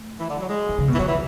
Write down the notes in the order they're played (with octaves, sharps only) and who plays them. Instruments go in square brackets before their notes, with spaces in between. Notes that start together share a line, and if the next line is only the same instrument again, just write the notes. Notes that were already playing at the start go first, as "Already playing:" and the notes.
Already playing: [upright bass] A3
[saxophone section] E3
D3
F#3
G#3
[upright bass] E3
C#3
B2
[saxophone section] E3
[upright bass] D3 [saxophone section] F#3
[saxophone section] E3